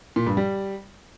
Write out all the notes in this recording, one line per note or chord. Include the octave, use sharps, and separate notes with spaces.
A#2
G2
G3